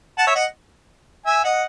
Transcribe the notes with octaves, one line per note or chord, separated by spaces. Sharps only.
F#5 A5
C#5 E5
D#5 F#5
E5 G#5
D#5 F#5